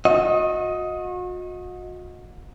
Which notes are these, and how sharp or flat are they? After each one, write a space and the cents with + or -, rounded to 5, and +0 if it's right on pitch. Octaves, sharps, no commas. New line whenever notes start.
F#4 -35 D#5 +15